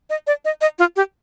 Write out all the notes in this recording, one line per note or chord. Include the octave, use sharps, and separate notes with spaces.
D#5
D5
D#5
D#5
F4
G4